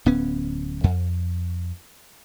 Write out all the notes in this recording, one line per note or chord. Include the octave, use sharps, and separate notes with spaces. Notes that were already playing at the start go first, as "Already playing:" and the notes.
D1 B3 C#4
F2